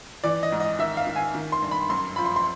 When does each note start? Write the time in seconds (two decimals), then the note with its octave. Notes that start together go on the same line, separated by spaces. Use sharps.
0.24 E3 D5
0.43 D#5
0.52 G#2
0.60 D#5
0.79 D#3 E5
0.97 F5
1.07 D#3
1.16 G#5
1.35 D#3
1.52 C6
1.62 G2
1.71 B5
1.90 F#2 C6
2.16 F3 B5
2.26 C6
2.36 C6